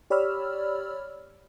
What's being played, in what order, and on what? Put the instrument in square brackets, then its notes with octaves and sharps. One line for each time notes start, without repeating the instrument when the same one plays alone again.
[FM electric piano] G4 C#5 D5 B5 E6 F6